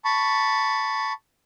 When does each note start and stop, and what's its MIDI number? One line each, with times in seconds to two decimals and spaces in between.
0.05 1.13 81
0.05 1.13 83
0.05 1.13 85